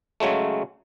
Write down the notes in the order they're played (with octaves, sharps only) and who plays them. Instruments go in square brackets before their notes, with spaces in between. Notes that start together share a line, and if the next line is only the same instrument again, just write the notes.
[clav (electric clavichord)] C#3 F#3 G#3 A3